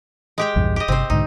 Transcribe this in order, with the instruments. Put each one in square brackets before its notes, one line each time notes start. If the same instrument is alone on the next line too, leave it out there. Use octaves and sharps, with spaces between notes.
[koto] G#3 G4 G5
[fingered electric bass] A#1 E2 G2
[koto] G4 D#5
[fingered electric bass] G1 C3 [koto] C4 C5
[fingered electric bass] B1 G#2 D3 [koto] D#4